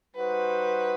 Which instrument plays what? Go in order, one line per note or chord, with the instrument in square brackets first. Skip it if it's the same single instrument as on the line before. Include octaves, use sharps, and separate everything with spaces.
[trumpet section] G3 D#4 F#4 C5 F#5 [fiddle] B4